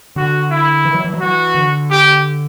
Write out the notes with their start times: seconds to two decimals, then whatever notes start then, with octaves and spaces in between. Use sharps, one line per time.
0.16 D3 F#4
0.50 E4
0.85 E3
0.95 F#3
1.04 E3
1.14 F#3
1.20 E3 F#4
1.55 D3
1.90 G4